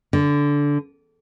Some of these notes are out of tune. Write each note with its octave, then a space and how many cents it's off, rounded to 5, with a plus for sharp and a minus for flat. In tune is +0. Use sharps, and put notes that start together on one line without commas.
D3 -15